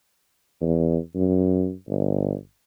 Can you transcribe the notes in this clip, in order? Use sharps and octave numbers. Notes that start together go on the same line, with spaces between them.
E2
F#2
G1